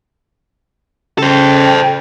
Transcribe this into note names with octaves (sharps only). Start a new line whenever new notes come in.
C#3 A4 C5 G5